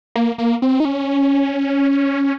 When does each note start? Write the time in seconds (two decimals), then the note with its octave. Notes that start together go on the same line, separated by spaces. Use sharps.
0.16 A#3
0.38 A#3
0.62 C4
0.80 D#4
0.85 C#4